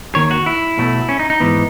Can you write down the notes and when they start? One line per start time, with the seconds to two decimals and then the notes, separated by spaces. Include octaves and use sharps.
0.15 D#2 D#3 C#5
0.31 F#4
0.46 E4
0.77 B1 B2 F#3 A3
1.09 C#4
1.19 D#4
1.30 D#4
1.40 G#2 E3 B3